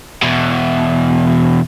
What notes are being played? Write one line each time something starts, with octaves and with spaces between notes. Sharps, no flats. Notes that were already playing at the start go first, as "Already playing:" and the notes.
E2 B2